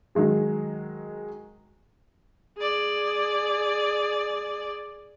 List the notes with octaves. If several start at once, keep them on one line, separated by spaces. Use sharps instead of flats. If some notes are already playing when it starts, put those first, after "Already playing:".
D#3 F#3 G#3 G#4
G#4 D5